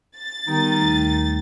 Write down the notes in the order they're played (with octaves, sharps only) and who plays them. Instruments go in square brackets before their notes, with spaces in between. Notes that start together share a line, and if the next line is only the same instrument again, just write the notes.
[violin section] A6
[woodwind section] D#3 D#4 [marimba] G3 B3 G4
[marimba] D#2 A3